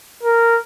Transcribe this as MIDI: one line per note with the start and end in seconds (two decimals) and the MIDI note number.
0.23 0.61 70